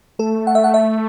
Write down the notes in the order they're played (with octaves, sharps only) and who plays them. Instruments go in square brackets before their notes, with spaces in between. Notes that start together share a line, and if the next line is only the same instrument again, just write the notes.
[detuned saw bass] A3 [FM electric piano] A4
[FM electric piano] F#5
E5
F#5
E5